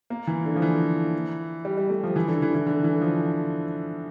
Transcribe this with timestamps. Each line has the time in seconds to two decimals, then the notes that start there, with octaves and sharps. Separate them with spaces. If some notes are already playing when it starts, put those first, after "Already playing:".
0.10 A#3
0.27 E3
0.45 D3
0.56 F3
0.62 E3
1.65 G3
1.78 G3
1.90 A3
2.03 F3
2.16 E3
2.28 D3
2.42 E3
2.55 E3
2.67 D3
2.84 E3
3.01 F3